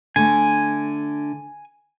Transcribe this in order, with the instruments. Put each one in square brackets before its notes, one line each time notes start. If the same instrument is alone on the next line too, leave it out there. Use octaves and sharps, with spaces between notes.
[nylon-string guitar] D3 A3 [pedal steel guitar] G#5